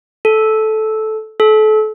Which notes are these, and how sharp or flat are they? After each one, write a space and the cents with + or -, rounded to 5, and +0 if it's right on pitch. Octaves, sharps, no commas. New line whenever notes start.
A4 -10
A4 -30